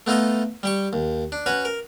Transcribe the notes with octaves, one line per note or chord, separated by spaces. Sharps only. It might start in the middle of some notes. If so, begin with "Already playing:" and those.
A3 B3 D#4 F4 A4 D#5
G3 G4 C#6
D#2
D4
C#4 F#4 B4 C#5
A#4